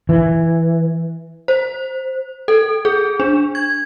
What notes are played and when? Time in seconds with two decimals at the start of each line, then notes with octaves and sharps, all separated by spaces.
0.09 E3
1.48 C5
2.48 A4
2.85 G#4
3.20 D4
3.55 G#6